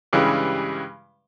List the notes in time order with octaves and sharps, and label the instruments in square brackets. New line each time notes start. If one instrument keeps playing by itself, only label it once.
[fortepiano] G2 C#3 E3 G3 G#3